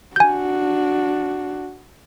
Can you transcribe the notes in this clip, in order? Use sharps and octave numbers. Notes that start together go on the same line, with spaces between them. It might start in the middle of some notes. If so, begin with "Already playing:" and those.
D4 F#4 G#5 G6